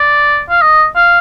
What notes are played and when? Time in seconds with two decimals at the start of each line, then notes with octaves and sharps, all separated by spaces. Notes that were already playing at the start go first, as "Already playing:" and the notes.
Already playing: D5
0.50 F5
0.62 D#5
0.96 F5